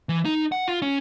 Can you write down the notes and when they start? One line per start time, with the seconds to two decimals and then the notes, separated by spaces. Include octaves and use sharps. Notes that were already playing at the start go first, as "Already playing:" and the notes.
0.09 E3
0.25 D#4
0.52 F#5
0.68 F4
0.82 C#4